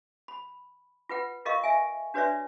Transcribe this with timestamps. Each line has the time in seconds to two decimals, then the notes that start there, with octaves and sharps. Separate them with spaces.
0.28 B5
1.09 F4 B4 F#5
1.45 F4 A#4 D#5 F5 C#6
1.64 E5 G#5
2.14 D4 F#4 B4 C#5 D5 E5